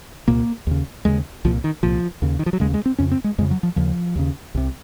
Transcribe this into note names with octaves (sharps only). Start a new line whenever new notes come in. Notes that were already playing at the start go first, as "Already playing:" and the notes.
C2 A#2 A#3
D#2 C#3
D#2 C#3 G#3
C2 A#2 F3
D#3
C2 A#2 F3
D#2 C#3
D#3
F3
F#3
D#2 C#3 G#3
G#3
C4
F2 C#3 C#4
C4
G#3
F2 C#3 G#3
F#3
F3
D#2 C#3 F3
D#2 C#3
C2 C3